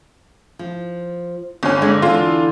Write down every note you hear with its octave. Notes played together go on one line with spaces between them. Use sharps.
F3
G1 D#2 C#4
D3 G#3
E2 D3 F4